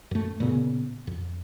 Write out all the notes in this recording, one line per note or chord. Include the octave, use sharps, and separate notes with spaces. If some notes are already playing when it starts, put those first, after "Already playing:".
F#2 A3
A#2 C#3 B3
F2